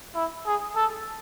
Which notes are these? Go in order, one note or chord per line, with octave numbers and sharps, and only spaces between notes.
E4
G#4
A4